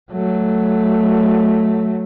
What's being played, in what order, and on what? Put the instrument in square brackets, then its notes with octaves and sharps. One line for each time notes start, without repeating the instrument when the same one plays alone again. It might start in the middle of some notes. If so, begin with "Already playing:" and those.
[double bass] F#3 A3